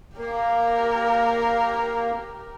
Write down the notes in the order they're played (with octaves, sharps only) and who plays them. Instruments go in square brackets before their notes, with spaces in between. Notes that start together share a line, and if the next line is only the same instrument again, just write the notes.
[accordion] A#3 [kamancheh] G4 A#4